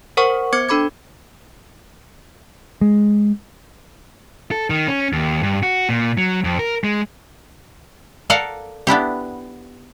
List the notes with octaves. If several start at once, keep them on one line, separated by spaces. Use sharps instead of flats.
A#4 C5 F#5 C#6
B3 C5 D6 G#6 C#7
D4 A4 B5 D6 G#6
G#3
A4
D#3
C#4
D#2
G2
F#4
A#2
F#3
F2
A#4
G#3
A4 A#4 D5 F5 F#5
B3 D4 E4 G4